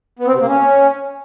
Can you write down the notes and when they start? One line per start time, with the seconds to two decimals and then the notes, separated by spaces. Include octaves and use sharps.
0.19 B3
0.26 C4
0.34 C3
0.41 A#3
0.48 C#4